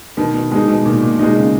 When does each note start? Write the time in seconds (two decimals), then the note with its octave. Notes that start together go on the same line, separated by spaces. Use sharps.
0.17 B2 D#3
0.34 B2
0.52 B2 G#3 D#4
0.68 B2
0.85 A#2 D#3
1.02 A#2
1.19 B2 D#4
1.23 G#3
1.37 C#3